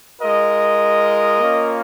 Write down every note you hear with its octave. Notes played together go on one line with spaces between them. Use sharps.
G#3 F4 A#4 D#5
A#3 C#4 F4